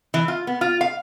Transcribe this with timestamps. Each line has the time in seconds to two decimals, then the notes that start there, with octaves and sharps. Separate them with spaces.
0.14 E3
0.28 F4
0.47 B3
0.61 F4
0.81 F5